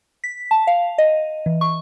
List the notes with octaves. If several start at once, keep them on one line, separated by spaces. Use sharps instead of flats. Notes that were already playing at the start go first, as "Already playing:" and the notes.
B6
A5
F5
D#5
E3
C#6